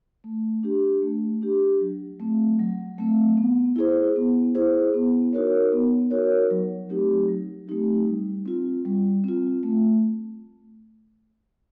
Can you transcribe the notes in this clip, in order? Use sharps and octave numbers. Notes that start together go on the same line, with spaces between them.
A3
D4 G4
A3
D4 G4
F#3
A3 C4
F#3
A3 C4
B3
E4 G#4 C5
B3
E4 G#4 C5
B3
D#4 F#4 A#4 C#5
B3
D#4 F#4 A#4 C#5
F#3
A3 C4 D#4 G4
F#3
A3 C4 D#4 G4
G3
C4 F4
G3
C4 F4
A3